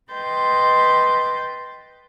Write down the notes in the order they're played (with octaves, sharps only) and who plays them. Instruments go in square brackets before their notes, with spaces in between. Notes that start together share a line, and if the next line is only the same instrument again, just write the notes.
[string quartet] B4 D#5 G5 C6 G6 A6